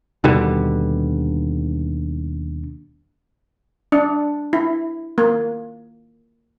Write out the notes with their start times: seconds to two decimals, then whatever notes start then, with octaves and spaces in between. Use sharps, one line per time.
0.24 D#2 B2 D3 G3
3.92 D4
4.53 E4
5.18 A#3